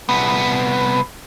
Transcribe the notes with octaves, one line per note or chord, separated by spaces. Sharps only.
C2 B3